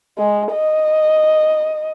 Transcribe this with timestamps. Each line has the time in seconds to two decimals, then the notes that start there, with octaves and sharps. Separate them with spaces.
0.18 G#3
0.53 D#5